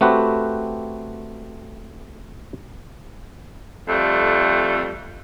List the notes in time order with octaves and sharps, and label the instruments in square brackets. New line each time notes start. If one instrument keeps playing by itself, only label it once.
[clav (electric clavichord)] A3 C4 F#4 G4 B4
[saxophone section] F2 G3 A3